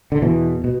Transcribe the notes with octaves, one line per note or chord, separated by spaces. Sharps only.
D3
E2 B2 E3
B2